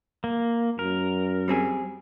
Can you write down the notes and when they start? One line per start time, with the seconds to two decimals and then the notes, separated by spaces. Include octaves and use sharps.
0.24 A#3
0.79 F#2 A#4
1.48 G3 C4 G#4